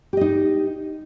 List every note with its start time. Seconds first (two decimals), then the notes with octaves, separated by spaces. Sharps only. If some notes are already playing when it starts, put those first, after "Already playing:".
0.13 G4
0.17 D#5
0.21 D#4